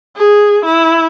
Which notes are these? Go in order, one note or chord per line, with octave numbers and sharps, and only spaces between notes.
G#4
E4